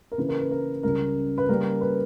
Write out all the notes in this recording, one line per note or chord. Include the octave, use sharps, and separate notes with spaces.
A#4
C#3 E3 A#3 E4 B4
A#4
B4
A#4
C#2 C#3 G3 C#4 A#4
B4
C#3 G3 A#3 A#4
B4